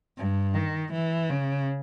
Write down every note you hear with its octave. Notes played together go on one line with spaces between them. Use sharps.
G2
D#3
E3
C#3